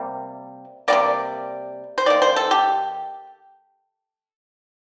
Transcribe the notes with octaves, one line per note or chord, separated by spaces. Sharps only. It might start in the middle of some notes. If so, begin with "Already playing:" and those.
Already playing: C3 G3 A#3
C3 G3 A#3 D5
C5
D#3 A#3 D5
C5
A4
G4